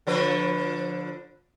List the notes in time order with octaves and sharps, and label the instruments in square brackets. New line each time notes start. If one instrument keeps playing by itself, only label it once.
[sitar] D3 F3 B4